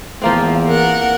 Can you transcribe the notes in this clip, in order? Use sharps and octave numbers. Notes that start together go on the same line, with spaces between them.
E2 F3 A#3 C4
A#4 F#5